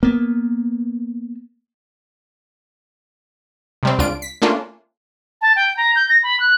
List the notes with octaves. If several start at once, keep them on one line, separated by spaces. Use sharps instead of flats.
A#3 B3
C3 G3 C4
C#2 D4 F4 D7
B6
A3 A#3 C#4 D4 F4
A5
G5
A#5
G6
A#6
B5
F#6